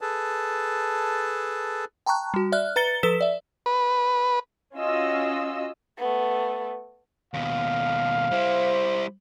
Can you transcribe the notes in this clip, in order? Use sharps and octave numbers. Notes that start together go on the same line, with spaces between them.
G#4 A4 B4 A5
G5 A5 A#5 C#6 F#6
G3 F#4
D5 E5 F6 F#6
B4 A#5 A6 C#7 G7
F3 A4 B4 E6 B6 E7
D5 E5
B4
C#4 F4 F#4 D#5 E6
A3 B3
D#2 B2 F5
G3 E4 C5